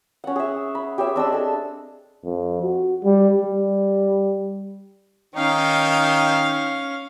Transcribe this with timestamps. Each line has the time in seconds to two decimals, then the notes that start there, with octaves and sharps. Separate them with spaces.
0.24 C#4 F#5
0.36 G#4 E5
0.75 B5
0.98 G4 G#4 C#5 E5
1.16 C4 D4 D#5 E6
1.32 G#4 A4
2.25 F2
2.63 F#4
3.04 G3
3.42 G3
5.35 D#3 C#4 D#4 F5 G5